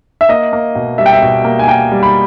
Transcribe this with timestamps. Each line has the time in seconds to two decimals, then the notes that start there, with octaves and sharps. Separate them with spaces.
0.21 E5
0.29 A#3 D#5
0.53 A#3
0.75 B2
0.98 G3 E5
1.06 G5
1.13 E5
1.22 B2
1.44 A#3
1.59 G#5
1.68 A#3 G5
1.92 G3
2.03 B5